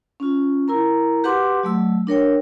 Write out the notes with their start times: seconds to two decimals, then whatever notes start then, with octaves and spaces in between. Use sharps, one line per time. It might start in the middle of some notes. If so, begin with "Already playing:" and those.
0.20 C#4 F4
0.68 E4 A#4 A#5
1.24 F#4 G4 B4 F#5 C6 D6
1.63 F#3 A3 E6
2.07 D4 A#4 C#5 G5